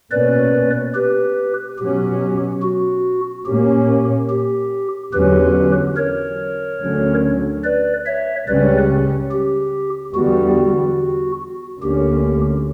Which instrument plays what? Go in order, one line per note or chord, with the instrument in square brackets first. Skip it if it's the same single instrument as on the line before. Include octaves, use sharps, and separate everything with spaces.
[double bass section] B2 A#3 C#4 [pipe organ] B4 D5
[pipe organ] G4 B4
[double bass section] B2 F#3 C#4 [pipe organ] G4
[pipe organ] F#4
[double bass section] A#2 A#3 C#4 [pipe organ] G4
[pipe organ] G4
[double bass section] E2 D3 F#3 C#4 [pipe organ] G4 B4
[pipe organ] A#4 C#5
[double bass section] D2 D3 F#3 C#4
[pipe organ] B4 D5
C#5 E5
[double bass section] C#2 C#3 G3 C#4 [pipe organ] B4 D5
[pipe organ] G4
[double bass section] E2 D3 G3 B3 [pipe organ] F#4
[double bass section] D2 D3 A#3 C#4 [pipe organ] G4